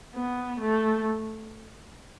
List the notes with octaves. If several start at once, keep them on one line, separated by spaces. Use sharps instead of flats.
B3
A3